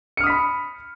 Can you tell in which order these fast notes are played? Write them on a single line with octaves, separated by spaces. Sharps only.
C#7 F6 D#6 B6 B5